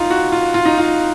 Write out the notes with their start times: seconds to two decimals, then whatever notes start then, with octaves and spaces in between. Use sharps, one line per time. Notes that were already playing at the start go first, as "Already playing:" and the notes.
Already playing: D#4 F4
0.10 F#4
0.32 F4
0.54 F4
0.65 D#4
0.78 F4